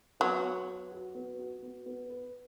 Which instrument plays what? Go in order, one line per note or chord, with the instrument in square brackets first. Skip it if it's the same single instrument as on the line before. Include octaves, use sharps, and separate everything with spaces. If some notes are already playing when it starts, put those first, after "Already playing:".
[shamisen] F#3 [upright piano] B3
[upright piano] B3
B4
F#4
B3
F#4
B3
B3
B4